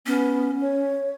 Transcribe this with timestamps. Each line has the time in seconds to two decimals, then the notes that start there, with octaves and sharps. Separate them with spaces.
0.06 B3 C#4
0.61 C#5